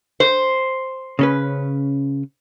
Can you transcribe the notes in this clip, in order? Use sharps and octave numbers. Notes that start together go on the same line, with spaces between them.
C5
C#3 C#4 B4